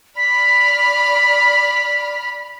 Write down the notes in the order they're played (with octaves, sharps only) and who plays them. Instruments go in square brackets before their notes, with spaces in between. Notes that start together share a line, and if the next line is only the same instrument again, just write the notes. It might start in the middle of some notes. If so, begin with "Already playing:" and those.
[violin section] D5 B5 F6 [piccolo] B6